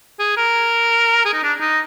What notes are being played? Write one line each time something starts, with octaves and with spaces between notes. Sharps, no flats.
G#4
A#4
G#4
D#4
D4
D#4